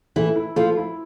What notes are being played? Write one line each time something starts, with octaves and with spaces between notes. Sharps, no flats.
E3 A3 E4
E4
F3 A3 F4
E4